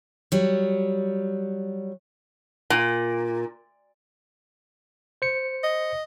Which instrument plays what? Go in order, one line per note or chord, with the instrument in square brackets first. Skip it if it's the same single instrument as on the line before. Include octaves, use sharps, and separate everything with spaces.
[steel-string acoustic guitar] F#3 G3
[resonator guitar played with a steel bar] A#2
[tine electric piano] C5 C#7
[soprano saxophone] D#5